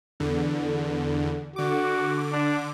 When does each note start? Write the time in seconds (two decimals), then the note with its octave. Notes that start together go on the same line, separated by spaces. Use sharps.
0.20 E2 D3
1.56 D3 F#4 D6
2.32 D4